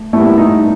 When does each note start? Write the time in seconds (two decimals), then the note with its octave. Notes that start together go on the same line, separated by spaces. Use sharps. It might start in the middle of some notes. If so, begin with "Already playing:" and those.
Already playing: A3
0.13 A#2 G3 A3 B3 E4
0.38 D#4